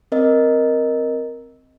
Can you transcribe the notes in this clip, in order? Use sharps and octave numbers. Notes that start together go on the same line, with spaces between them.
C4 A#4 D#5